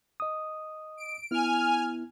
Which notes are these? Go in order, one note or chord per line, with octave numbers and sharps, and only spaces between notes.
D#5 D#6
D7
B3 E4 G#5 F6